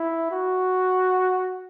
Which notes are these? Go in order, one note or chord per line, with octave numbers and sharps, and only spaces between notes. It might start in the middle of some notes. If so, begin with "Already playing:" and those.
Already playing: E4
F#4